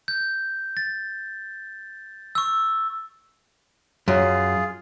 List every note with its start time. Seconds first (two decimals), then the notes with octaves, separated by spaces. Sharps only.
0.08 G6
0.77 A6
2.35 C#6 E6
4.08 F#2 F4 G#4